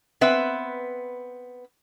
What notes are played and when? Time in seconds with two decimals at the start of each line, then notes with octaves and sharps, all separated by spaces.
0.21 B3 C4 B4 E5